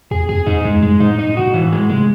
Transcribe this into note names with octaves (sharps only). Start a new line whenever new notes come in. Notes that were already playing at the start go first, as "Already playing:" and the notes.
E2 G#4
F#2 G#4
E2 D#4
F#2 G#3
F#2 G#3
G#2 D#4
A2
G#2 D#4
A2
G#2 F#4
A2
G#2 E3
G#3
C3 G#3